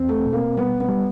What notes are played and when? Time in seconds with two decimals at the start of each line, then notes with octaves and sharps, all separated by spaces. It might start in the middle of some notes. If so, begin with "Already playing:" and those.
Already playing: E2 C4
0.09 A3
0.26 B2
0.33 A#3
0.57 G3 B3
0.80 B3
0.88 G3